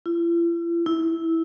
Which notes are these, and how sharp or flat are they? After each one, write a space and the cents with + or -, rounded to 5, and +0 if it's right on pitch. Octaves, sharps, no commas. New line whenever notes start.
E4 +45
E4 -15